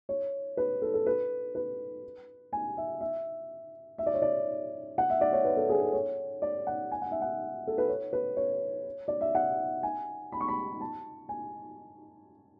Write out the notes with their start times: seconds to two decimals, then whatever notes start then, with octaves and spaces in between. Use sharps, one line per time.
0.09 C#5
0.57 B4
0.82 A4
0.94 A4
1.06 B4
1.55 B4
2.53 G#5
2.77 E5
3.01 E5
3.98 E5
4.06 D5
4.14 C#5
4.22 D5
4.98 F#5
5.10 E5
5.21 D5
5.33 C#5
5.45 B4
5.57 A4
5.69 G#4
5.81 A4
5.93 C#5
6.42 D5
6.67 F#5
6.91 G#5
7.02 F#5
7.11 E5
7.21 F#5
7.67 A4
7.78 B4
7.89 C#5
8.13 B4
8.37 C#5
9.08 D5
9.21 E5
9.35 F#5
9.83 G#5
10.32 B5
10.41 C#6
10.48 B5
10.81 A5
11.29 G#5